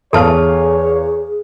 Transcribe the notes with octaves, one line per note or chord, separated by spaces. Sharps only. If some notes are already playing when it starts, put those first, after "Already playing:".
E2 G#4 A4 C#5 F5 A5 F6